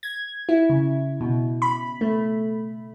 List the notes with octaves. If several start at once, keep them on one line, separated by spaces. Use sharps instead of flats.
G#6
E4
C#3
B2
B5
A3